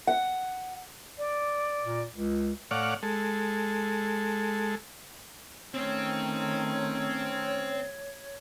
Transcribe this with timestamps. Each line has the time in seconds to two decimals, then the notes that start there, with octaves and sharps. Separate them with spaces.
0.07 F#5
1.18 D5
1.84 A#2
2.14 C#2
2.71 A2 C#5 D5 F5 F#5
3.03 G#3 A4
5.74 D#3 A3 C4 C#4 C#5